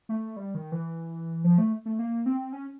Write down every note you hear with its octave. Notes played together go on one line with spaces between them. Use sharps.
A3
G3
D#3
E3
F3
A3
A3
A#3
C4
C#4